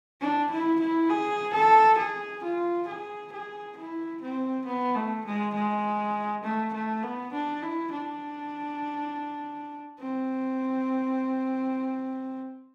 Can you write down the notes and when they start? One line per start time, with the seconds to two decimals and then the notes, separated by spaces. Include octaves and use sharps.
0.21 D4
0.51 E4
0.80 E4
1.10 G#4
1.54 A4
1.99 G#4
2.44 F4
2.88 G#4
3.33 G#4
3.77 E4
4.22 C4
4.66 B3
4.95 A3
5.26 G#3
5.55 G#3
6.44 A3
6.74 A3
7.03 B3
7.33 D4
7.63 E4
7.92 D4
10.00 C4